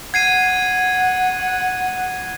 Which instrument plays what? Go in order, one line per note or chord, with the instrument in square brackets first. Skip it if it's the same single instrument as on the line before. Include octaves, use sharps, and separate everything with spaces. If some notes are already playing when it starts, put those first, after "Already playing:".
[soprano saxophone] F#5 [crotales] G#6 C7 D#7